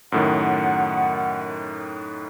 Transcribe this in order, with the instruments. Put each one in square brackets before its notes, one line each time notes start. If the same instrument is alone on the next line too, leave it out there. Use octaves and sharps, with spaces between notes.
[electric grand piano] F#2 A2 D#3 [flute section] F#5